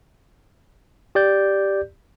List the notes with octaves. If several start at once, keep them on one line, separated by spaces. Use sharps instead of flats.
G4 D5 G6